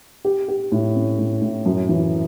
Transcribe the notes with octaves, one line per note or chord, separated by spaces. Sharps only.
G4
G4
A2
C#4
A2
A2
F#2
E3